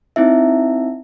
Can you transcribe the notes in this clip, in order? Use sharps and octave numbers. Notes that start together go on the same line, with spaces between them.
C4 D#4 E4 E5